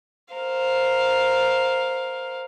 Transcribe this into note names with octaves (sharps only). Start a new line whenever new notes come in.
A#4 C5 F5